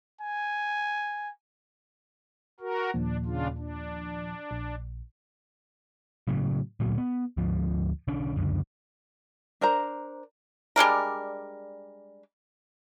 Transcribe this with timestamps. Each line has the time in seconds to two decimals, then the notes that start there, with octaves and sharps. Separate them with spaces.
0.21 G#5
2.60 F#4 A#4
2.94 D#2 A#2 F3 D4
3.25 C#3 D4 F4
3.58 D4
4.51 A#1
6.28 A2 C#3 F#3
6.80 D2 A#2 F#3
6.98 B3
7.37 D2 G#2 F3
8.08 B1 D3 C#4 D4
8.36 C#2 F#2 D3
9.61 D4 A#4 C5 A#5
10.76 G3 G#3 D4 A#4